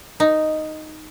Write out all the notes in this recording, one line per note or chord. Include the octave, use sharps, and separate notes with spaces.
D#4